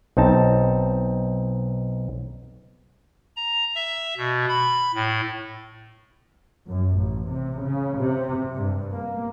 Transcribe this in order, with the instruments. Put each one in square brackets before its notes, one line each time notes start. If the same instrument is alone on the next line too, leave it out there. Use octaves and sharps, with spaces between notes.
[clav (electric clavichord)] B1 C4 D#4 A5
[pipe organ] A#5
E5
B2
B5
A2
[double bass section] F#2
A1
C3
C#3
C3
G2
A#3